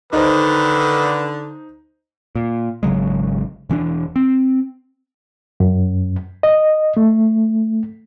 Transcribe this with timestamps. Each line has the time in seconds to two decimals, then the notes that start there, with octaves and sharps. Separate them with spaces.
0.13 D3 D#3 D#4 B4 C5
2.35 A#2
2.83 G#1 C#3 F#3 G#3
3.69 E1 E3 C#4 D4
4.16 C4
5.60 F#2
6.43 D#5
6.97 A3